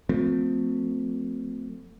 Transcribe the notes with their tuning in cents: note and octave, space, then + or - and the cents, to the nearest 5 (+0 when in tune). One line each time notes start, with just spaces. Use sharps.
F3 +40 A3 +25 C4 -15